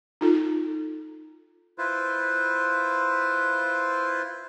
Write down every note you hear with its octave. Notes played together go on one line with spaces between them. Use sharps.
D#4 F4 A4
E4 F4 B4 C5